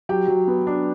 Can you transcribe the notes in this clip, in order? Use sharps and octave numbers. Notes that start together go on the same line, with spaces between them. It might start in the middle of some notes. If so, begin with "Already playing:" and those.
F#3 G4 G5
F#3
B3
D4